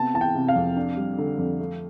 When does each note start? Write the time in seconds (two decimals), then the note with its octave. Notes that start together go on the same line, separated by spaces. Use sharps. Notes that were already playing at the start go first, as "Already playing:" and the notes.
Already playing: C3 B3 A5
0.14 E3 A5
0.21 G5
0.35 C3
0.48 F5
0.56 F2
0.77 D4
0.97 G3
1.18 D3
1.38 F2
1.59 A3